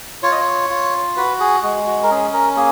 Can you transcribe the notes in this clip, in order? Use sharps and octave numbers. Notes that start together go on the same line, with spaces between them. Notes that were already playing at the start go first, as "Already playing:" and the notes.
F4 C#5
D#5
C#5
F4
F#4 B4
G#4
G#3 F#4
F#4
A#4
C#4 G#4
A#4
A#3 G#4